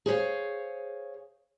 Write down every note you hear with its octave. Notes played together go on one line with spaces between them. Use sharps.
G#4 C5 C#5 F5